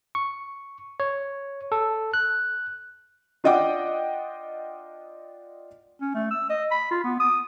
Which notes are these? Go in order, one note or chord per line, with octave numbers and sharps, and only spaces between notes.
C#6
C#5
A4
F#6
D4 F4 D#5 F#5 G5 D6
C#4
A3
E6
D#5
B5
F4
B3
D#6